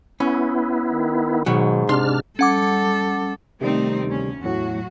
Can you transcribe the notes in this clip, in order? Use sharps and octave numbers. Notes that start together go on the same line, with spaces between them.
B3 C#4 E4
D#3
G#2 B2 D#3 F#3
C3 D4 C6 F6
G3 C#4 A4 F#5 D6
C3 D#3 G3 A3 C4 D#4
D2 C#4
E2 A2 F#3 A3 F#4